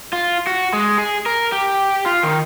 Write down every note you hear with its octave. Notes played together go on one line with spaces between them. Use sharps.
F4
F#4
G#3
G#4
A#4
G4
F4
D#3